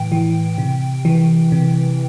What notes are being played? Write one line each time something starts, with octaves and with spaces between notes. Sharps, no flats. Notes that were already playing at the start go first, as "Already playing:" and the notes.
Already playing: A2 E3 G5
E3
C3
E3
C3